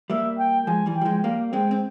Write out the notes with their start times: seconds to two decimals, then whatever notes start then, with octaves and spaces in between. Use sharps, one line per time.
0.10 G3 A#3 E5
0.38 G5
0.67 F3 G#3 G#5
0.86 E3 G3
0.96 G5
1.01 G3
1.05 F3 G#3
1.24 G3 A#3 F5
1.53 G#3 C4 G5
1.71 C4